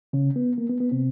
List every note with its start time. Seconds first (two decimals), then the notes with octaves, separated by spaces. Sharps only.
0.13 C#3 C#4
0.36 B3
0.58 A#3
0.69 B3
0.80 B3
0.91 C3 C4